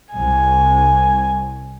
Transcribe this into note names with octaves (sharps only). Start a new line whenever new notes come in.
C2 G#5